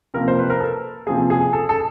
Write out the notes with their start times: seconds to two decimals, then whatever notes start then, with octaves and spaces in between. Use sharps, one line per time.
0.14 C3 F3 A#3 A#4
0.28 C5
0.39 B4
0.50 A#4
0.60 A4
1.06 C3 F3 A#3 G#4
1.30 G#4
1.53 A4
1.69 A4